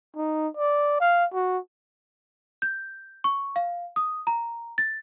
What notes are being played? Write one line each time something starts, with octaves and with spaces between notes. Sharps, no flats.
D#4
D5
F5
F#4
G6
C#6
F5
D#6
A#5
A6